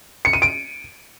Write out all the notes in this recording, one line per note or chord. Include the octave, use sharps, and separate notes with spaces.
C#7
D#7
D7